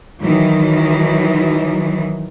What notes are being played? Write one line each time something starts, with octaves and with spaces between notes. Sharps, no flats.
D#3 E3 F#3